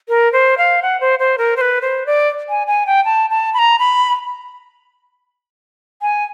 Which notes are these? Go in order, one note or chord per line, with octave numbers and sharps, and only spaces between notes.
A#4
C5
F5
F#5
C5
C5
A#4
C5
B4
C5
D5
G#5
G#5
G5
A5
A5
B5
A#5
B5
G#5